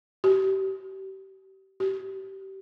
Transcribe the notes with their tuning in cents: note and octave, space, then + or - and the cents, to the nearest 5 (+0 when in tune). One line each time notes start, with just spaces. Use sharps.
G4 -30
G4 -25